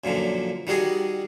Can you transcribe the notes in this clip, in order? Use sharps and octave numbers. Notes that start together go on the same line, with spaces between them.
F#2 A#2 D3 F3
D#3 G3 F#4 G#4 D#5